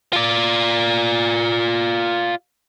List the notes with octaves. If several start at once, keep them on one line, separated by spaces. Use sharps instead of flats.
F4 D5